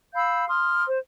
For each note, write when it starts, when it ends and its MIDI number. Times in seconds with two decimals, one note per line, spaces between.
0.14 0.47 77
0.14 0.47 83
0.14 0.47 88
0.14 0.47 91
0.49 0.84 84
0.49 0.84 87
0.49 0.84 89
0.86 0.98 72